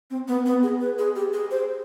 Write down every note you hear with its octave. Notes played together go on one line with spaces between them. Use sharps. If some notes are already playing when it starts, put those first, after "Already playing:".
C4
B3
B3
G#4
B4
G#4
G4
G#4
C5